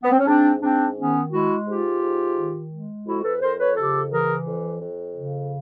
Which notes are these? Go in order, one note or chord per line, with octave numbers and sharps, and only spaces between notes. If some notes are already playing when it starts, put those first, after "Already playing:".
B3
C4
C#4
G#2 C4 D4
G#2 C4 D4
D#3 B3 C#4
G#3 E4 F#4
G#2 F4 G4
G#2
D#3
G#3
F2 E4 F#4
A4 B4
F2 A#4 C5
B4 C#5
C#3 G4 A4
E3 G#4 A#4
F2
F2
C#3